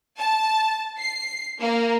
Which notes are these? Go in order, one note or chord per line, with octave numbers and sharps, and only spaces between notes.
A5
C7
A#3